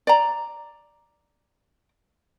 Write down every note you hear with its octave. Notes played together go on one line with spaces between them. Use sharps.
D5 A#5